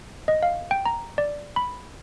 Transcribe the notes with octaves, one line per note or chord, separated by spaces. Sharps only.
D#5
F5
G5
A#5
D5
B5